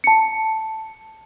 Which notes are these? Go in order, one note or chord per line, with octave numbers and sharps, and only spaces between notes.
A5 C#7